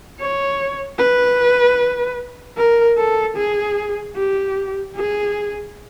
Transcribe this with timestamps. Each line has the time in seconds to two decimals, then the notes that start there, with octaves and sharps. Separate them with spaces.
0.20 C#5
0.99 B4
2.57 A#4
2.98 A4
3.37 G#4
4.16 G4
4.96 G#4